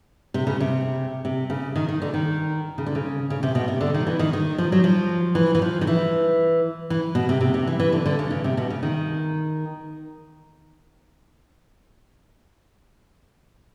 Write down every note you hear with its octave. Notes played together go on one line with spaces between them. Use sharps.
C3
C#3
C3
C3
C#3
D#3
D#3
D3
D#3
C#3
D3
C#3
C#3
C3
B2
C3
D3
D#3
E3
D#3
D#3
F3
F#3
F3
E3
E3
F3
D#3
E3
E3
B2
C3
C3
C3
E3
E3
D3
D3
C#3
C#3
C3
B2
C#3
D#3